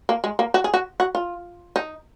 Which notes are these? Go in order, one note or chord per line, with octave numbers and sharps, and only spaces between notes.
A#3
G#3
A#3
F#4
G#4
F#4
F#4
F4
D#4